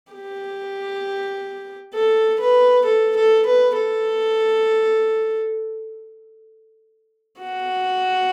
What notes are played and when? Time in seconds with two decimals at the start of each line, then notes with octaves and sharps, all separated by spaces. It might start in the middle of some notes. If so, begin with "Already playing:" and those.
0.13 G4
1.94 A4
2.40 B4
2.85 A4
3.16 A4
3.46 B4
3.76 A4
7.40 F#4